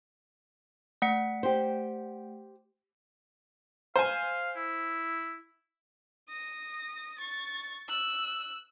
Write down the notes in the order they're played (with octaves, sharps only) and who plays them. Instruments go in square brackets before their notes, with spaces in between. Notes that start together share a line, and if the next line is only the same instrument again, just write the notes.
[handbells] A3 F#5 C#7
[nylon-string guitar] G4 C5
[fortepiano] C5 G#5 [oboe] F5
[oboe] E4
[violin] D#6 A#6
C#6 A6
E6 F#6